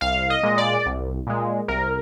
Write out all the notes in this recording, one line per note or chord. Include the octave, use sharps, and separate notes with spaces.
C2 F5
D#5
A#2 G#3
D5
C2
A#2 G#3
C2 A#4